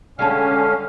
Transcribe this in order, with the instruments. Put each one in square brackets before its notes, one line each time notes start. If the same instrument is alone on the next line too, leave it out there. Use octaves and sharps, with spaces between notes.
[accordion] D3 C#4 [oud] G3 G#3 A4 [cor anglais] F5